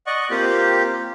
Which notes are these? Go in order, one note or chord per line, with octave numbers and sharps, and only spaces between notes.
D5 D#5 F#5 C#6
A#3 C4 F4 G4